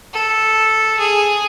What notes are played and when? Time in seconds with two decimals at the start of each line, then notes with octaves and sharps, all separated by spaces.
0.13 A4
0.99 G#4